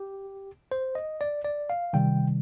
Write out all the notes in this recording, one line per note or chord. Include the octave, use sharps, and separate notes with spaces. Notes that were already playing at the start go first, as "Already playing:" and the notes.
Already playing: G4
C5
D#5
D5
D5
F5
C3 D#3 G3 G5